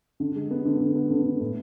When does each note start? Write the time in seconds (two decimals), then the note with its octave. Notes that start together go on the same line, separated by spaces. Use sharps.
0.20 D3
0.35 G#3
0.51 B3
0.65 D3
0.80 D3
0.95 B3
1.10 D3
1.25 D3
1.40 A2